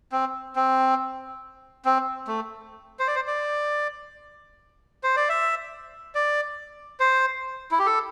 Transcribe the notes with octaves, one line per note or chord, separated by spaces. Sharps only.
C4
C4
C4
A3
C5
D5
C5
D5
C5
D5
E5
D5
C5
E4
G4
A4